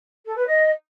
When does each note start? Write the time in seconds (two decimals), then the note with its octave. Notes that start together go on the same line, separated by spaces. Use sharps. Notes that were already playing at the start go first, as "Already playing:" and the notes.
0.25 A4
0.36 B4
0.47 D#5